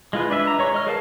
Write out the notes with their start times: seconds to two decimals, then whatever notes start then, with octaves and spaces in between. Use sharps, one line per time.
0.13 G#3 F4 B4
0.30 D4 B4 E5
0.47 A#5
0.59 G#3 C#5 C#6
0.74 D#5 F6
0.87 G#4 A#4 B4 F5 A5